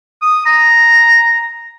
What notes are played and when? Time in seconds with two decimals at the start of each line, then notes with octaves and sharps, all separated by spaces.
0.22 D#6
0.46 A#5